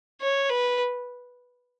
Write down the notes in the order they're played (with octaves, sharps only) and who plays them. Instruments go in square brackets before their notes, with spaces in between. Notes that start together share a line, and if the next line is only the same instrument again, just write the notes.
[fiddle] C#5
B4